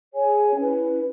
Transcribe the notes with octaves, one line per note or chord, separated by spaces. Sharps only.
G#4 C#5 G#5
C#4 E4 B4